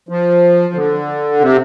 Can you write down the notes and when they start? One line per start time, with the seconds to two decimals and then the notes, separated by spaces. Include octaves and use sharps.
0.09 F3
0.74 D3
1.40 C3